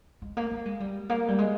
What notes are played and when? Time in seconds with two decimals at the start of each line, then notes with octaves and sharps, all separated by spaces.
0.22 G#3
0.37 A#3
0.51 A#3
0.66 G#3
0.80 G3
1.09 A#3
1.28 G3
1.38 G#3